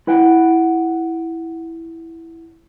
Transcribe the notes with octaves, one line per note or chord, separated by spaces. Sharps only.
E4 B4 F#5 G5